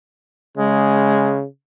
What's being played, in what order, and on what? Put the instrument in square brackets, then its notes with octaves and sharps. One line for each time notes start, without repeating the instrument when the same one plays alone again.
[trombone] C#3 [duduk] G#3